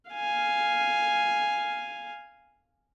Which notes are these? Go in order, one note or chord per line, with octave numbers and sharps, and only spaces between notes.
F5 G#5